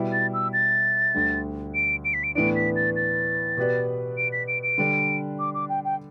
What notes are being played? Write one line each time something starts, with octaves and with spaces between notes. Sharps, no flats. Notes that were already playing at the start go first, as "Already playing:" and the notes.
Already playing: B2 G3 E4
A6
E6
A6
D2 D3 G3
D7
D7
B6
D7
A2 E3 B3 D4 D7
B6
A6
A6
B2 B3 G4 B4 D5
D7
B6
D7
D7
D3 G3 D4
D6
D6
G5
G5